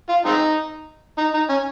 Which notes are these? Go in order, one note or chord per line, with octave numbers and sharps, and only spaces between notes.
F4
G#3 C4 D#4
D#4
D#4
C#4